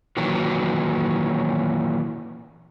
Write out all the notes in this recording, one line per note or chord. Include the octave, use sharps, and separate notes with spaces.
A#2 D#3 E3 F#3